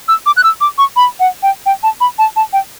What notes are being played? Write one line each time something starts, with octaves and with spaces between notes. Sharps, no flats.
E6
D6
F#6
E6
D6
C#6
B5
F#5
G5
G5
A5
B5
A5
A5
G5